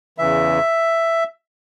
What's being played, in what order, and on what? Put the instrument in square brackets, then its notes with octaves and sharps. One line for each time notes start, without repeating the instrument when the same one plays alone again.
[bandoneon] E2 C#3 E3 E5